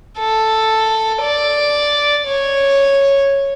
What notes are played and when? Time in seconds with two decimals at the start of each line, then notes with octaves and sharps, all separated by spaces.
0.18 A4
1.22 D5
2.27 C#5